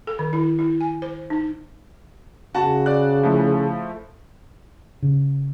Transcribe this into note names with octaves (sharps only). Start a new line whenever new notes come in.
A4
D#3
E4
E4
G#5
C5
D#4
C#3 F#4 A5
D5 F#6
F3 A3 E4
C#3